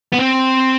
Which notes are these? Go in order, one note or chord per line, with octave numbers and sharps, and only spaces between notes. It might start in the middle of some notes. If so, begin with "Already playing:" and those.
B3
C4